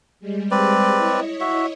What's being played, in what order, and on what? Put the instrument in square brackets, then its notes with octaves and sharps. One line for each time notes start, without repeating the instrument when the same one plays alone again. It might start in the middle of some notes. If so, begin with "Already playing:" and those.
[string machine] G3 G#3
[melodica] C4 B4 D5
[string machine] E4 C#5 D#5
[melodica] F#4 E5